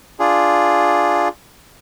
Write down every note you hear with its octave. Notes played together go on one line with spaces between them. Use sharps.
D4 F4 G#4